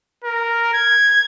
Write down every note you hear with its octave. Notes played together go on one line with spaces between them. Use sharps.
A#4
G#6